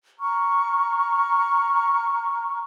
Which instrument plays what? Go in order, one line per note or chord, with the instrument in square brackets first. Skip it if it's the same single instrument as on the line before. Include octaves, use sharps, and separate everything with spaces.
[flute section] A#5 C#6 F6